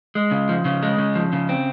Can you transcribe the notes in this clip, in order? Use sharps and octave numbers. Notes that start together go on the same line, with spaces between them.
G#3
C#3
F3
C#3
G#3
C#3
F3
C#3
C4